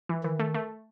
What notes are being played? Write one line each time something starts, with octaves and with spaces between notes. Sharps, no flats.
E3
D#3 E3
A3
A3